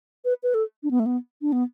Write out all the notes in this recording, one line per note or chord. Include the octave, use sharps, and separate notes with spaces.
B4
B4
A4
D4
B3
A3
B3
D4
B3